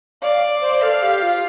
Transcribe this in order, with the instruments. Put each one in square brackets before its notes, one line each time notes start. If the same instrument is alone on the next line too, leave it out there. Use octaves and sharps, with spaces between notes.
[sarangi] D5 [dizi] F5
[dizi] C5
[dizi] A4 [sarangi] F5
[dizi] G4
F4